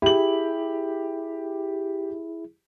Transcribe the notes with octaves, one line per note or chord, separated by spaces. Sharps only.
E4 G4 G#4 F#7